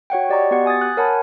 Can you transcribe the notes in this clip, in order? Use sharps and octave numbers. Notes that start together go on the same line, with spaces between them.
F#4 C#5 F#5 G5
G4 D5 D#5 A#5 C#6
B3 F#4 G4 F#5
G#5 D#6 G#6 A6
F#6
A#4 C#5 F#5 G#5 A5 B5